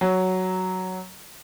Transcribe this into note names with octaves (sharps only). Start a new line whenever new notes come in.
F#3